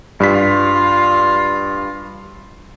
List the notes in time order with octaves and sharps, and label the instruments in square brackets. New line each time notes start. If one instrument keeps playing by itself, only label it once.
[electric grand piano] G2 B6 [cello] F4